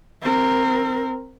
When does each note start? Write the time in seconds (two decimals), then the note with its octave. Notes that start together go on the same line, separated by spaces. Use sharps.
0.22 C4 A#4